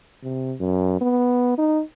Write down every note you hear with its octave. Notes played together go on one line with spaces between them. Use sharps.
C3
F#2
B3
D#4